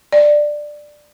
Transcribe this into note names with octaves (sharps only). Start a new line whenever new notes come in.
D5